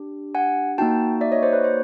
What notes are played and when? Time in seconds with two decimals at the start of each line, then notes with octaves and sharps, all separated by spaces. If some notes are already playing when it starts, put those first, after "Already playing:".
Already playing: D4 G4
0.35 F#5 G#5
0.78 A#3 D#4 F#4 G5 A5
1.21 D5 E5
1.32 C#5 D#5
1.43 C5 D5
1.53 B4 C#5
1.64 C5